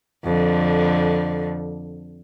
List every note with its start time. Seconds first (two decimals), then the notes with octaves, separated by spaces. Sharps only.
0.25 F2 D3